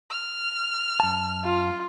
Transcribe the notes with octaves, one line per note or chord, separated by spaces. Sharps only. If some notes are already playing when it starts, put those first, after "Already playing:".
F6
F#2 A5
F4